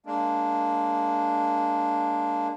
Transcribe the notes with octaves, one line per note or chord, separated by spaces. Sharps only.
G#3 A#3 D4